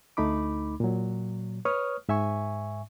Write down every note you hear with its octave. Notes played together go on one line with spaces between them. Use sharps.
D2 A3 D#4 B5 D6
A#2 F#3
B4 C#5 C#6 D#6 F6
G#2 E5 G#5 C#6